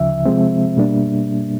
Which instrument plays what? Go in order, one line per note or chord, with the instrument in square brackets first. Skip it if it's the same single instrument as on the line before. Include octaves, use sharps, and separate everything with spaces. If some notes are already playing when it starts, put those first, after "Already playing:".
Already playing: [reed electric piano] D2 C#3 F3 E5
C3 F3 G#3 C4
B2 G3 A#3 D4